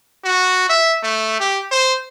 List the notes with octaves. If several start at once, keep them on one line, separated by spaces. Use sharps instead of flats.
F#4
E5
A3
G4
C5